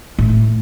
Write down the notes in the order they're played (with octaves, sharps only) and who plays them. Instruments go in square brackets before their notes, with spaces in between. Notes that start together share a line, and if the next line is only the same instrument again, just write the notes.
[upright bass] A2